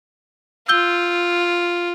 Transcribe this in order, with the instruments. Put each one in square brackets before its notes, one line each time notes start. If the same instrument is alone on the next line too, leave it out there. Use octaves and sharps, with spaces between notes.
[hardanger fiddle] F4 [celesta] E6 G6 G7